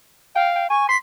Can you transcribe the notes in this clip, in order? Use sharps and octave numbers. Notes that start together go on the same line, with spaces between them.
F5 G5
G5
G#5 C#6
C6 B6